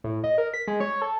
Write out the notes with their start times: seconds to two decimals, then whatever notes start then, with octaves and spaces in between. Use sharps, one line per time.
0.04 A2
0.24 D#5
0.38 A#4
0.54 B6
0.68 G#3
0.80 C#5
1.02 A4